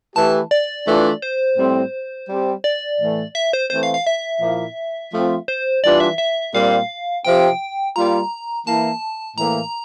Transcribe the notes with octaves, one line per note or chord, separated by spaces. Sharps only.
E3 A3 E4 G4 A5
D5
E3 A3 D4 F4
C5
A2 G3 C4
G3 C4 G4
D5
A2 E3 A3
E5
C5
E3 A3 C4 C5
F5
F5
E5
A#2 F3 A#3 E4
F3 A3 C4 F4
C5
E3 G3 D4 F4 D5
E5
E5
A#2 G3 C4 G4 F5
C3 F3 C4 G4 G5
G3 A#3 F4 A#5
E3 A#3 E4 A5
A2 E3 A#3 A#5